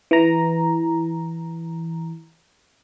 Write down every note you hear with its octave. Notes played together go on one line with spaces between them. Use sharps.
E3 A#5